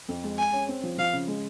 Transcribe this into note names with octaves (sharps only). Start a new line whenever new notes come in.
F2
G#3
G#4 G#5
C#4
C4
F3
F3 F5
C#3
G#3